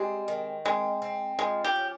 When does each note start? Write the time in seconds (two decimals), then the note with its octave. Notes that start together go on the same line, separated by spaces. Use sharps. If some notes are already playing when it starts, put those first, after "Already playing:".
Already playing: G3 G#3 C4
0.28 D#3
0.65 G#3 C4
1.02 C4
1.39 F3 G#3
1.64 G4
1.76 C#4